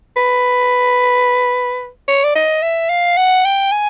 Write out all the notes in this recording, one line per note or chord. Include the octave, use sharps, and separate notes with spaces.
B4
C#5
D5
D#5
E5
F5
F#5
G5
G#5